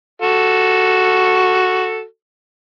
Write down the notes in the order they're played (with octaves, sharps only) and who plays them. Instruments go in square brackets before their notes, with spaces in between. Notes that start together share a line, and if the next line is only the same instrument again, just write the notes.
[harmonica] F#4 A4